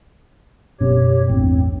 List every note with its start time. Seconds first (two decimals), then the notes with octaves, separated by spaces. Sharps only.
0.80 F#1 B2 C#4 G4 C#5
1.29 A1 E2 G2 C4